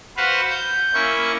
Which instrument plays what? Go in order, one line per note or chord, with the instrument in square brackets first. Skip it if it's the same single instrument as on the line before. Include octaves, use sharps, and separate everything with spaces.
[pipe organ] F#4 B4 C5 F5 F#5
G6
A#3 C#4 E4 C#6